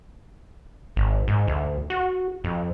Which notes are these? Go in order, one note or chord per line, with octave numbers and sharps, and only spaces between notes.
G#1
G#2
D2
F#4
F2